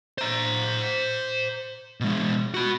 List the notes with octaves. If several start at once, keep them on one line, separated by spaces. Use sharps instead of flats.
C5 A#5
B2 G#3
F#4 B5